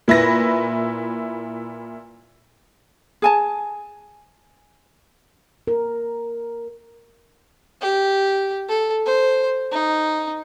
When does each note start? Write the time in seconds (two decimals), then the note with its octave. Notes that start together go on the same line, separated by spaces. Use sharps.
0.08 A#2 E4 B4 A#6
3.22 G#4 G#5 A5
5.67 A#4
7.81 G4
8.69 A4
9.06 C5
9.72 D#4